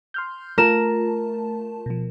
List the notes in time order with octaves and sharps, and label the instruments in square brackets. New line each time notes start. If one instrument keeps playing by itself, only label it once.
[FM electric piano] C6 F6 G6
[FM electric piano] A3 F4 A5 [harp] A#4 E7
[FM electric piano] B2 F3